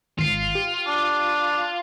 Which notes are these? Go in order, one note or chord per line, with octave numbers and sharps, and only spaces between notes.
G#1 F4 C7
G4
D4